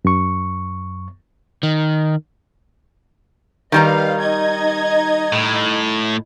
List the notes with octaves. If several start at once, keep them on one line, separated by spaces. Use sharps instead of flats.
F#2 C#6
D#3
D#3 G3 B4 D#5 F5 A#5
D#4 D#5 G#6
A2